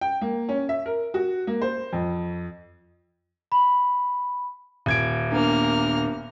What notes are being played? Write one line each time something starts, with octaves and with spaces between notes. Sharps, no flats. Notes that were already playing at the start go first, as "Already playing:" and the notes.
G5
A#3
C#4
E5
A#4
F#4
A#3
C5
F2
B5
D#1 G#6 D7
A#3 B3 D4 F6